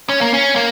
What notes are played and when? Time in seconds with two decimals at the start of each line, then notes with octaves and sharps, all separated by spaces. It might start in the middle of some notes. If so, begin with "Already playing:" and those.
0.09 C#4
0.21 A#3
0.34 C#4
0.56 A#3